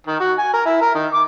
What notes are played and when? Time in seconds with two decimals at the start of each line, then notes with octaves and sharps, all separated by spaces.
0.07 D#3
0.20 F#4
0.38 G#5
0.53 A#4
0.66 E4
0.82 A#4
0.95 D#3
1.14 D6